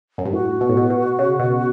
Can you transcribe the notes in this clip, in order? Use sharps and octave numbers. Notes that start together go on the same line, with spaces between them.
F#2
G2
A2 F#4
B2
A2
B2
B2
C#3
B2